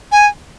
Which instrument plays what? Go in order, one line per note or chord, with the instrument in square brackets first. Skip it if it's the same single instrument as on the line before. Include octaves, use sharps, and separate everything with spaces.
[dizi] G#5